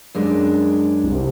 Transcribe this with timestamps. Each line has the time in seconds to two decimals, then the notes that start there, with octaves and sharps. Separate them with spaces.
0.15 F#2 G#3 D4
1.04 C2